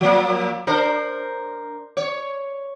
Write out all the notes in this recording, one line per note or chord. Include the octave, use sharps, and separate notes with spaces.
F3 A#3
D4 A#4 C5
C#5